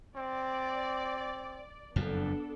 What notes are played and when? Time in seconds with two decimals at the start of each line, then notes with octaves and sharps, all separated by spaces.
0.16 C4 D5
1.96 F#1 F2 A2 B3 D4 A4